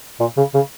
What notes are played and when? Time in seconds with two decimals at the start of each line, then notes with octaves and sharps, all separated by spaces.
0.20 A#2
0.37 C#3
0.54 C#3